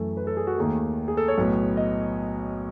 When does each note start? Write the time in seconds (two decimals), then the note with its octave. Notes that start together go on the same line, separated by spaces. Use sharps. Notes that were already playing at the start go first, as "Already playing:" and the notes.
Already playing: F#2 E3 A3 A4
0.17 B4
0.27 A4
0.37 G#4
0.47 F#4
0.58 D#2 D#3 A3 G#4
1.08 G#4
1.17 A4
1.28 C#5
1.38 B1 A2 F#3 B3
1.77 D#5